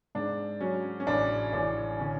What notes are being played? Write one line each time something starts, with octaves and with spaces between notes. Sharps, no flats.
G#2 D4
F#3 C#4
C#4
A1 D4
A1 D4
D3 C#4